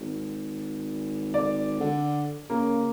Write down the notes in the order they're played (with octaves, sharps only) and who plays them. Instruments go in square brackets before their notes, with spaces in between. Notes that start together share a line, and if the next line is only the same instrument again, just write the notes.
[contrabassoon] G#1
[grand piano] D5
[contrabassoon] D3
[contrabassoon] C#3 [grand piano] A#3